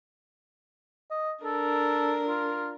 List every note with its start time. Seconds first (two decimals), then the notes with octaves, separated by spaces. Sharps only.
1.11 D#5
1.45 D4 A4 A#4
2.27 F4